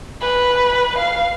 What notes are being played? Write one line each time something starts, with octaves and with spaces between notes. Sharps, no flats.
B4
F5